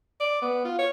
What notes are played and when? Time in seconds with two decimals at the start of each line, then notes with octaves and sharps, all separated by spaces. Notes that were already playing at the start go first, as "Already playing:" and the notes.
0.20 D5
0.42 B3
0.65 F4
0.79 C#5